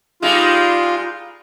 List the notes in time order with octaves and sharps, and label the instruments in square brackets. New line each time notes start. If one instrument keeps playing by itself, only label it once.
[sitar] G3 G#3 D#4 [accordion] F4